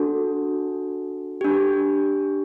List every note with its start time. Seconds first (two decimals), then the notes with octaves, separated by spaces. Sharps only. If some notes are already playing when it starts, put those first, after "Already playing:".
Already playing: D4 F#4 A4
1.41 D4 G4